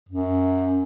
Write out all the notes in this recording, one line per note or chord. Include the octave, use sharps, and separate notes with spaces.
F#2